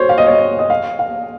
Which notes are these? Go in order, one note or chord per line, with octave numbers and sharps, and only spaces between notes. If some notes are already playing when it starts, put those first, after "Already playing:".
Already playing: F#4 C5 C#5
F5
D#5
C#5
D#5
F5
F5